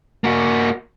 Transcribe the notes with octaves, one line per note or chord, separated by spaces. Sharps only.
A#3 F#4